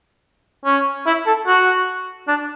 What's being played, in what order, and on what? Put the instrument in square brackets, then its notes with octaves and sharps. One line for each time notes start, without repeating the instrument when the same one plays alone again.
[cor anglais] C#4
E4
A4
F#4
D4